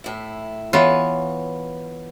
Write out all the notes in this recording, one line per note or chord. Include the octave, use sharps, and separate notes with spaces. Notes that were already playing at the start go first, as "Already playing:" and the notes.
A2 E4
E3 B3 F4 C#5